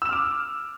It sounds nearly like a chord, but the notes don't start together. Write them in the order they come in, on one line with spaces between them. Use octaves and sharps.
E6 E7 F6 D6